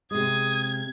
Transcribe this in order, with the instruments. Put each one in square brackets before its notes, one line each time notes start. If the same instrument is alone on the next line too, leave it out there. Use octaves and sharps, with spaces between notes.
[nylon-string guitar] C3 G#3 [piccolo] D#6 [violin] G#6